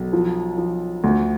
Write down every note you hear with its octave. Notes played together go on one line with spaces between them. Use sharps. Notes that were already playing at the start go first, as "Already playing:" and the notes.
Already playing: B1
F3
F3
D2